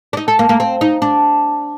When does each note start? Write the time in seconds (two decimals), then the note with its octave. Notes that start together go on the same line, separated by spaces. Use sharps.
0.13 D4
0.17 D#4
0.28 A4
0.39 A#3
0.49 A#3
0.60 C4
0.81 D#4
1.02 D4